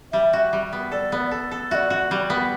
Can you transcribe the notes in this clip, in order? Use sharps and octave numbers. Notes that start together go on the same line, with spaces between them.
G3 E5
F#4
G3
B3
A4 D5
B3
A4
A4
F#4 D5 E5
F#4
G3
B3